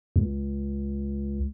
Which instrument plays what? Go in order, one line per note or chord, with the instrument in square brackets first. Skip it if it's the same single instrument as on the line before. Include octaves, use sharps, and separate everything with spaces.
[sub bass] C#2